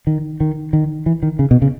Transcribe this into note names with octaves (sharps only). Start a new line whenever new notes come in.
D#3
D#3
D#3
E3
D#3
C#3
B2
C#3